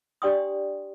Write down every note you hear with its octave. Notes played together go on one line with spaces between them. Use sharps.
D4 G4 D5 G5 C6 D#6